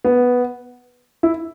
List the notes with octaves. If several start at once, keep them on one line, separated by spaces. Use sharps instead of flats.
B3
E4